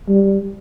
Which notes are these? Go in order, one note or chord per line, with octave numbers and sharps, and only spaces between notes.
G3